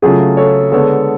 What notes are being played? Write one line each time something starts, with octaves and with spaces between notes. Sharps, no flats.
C#3 F#3 A3 F4 G#4
A4 C#5
D3 G#3 B3 A4 C#5